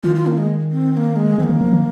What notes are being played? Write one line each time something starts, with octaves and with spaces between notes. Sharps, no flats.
D#3 F4
F4
A#3
G#3
C4
C4
A#3
G#3
D#3 C4
A#3
D#3
F3
D#3